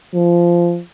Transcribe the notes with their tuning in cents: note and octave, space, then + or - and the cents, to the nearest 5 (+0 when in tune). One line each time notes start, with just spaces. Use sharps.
F3 -15